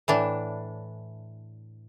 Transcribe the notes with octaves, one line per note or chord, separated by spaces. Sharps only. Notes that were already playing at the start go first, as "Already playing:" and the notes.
A2 E3 D4